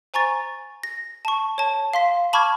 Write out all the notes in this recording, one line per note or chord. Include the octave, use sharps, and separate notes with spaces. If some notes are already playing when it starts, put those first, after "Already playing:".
C5 G#5 A#5 C#6 A6
A#6
A5 C#6
C#5 A5
F5 C6 B6
A5 B5 C#6 D6 F6 G#6